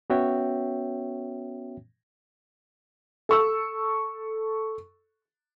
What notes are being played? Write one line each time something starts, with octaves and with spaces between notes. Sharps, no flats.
B3 C#4 F#4 C#5 E5 G5
A4 C#6 E6